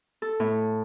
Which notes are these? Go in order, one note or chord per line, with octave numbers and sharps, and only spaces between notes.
A4
A2